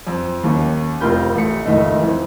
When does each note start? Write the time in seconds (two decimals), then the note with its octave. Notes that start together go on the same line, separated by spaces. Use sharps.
0.07 F2
0.44 D#2 C#4
1.01 F1 C3 F4 A#4 B5 G6
1.35 A1 A3 C#7
1.65 F1 C#2 A2 D#3 A3 D#4
1.99 F2 A2 E3